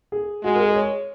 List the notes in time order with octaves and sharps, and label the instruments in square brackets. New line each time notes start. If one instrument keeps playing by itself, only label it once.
[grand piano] G#4
[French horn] G#3 [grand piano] F#4
[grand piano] A#4
G#4
C#5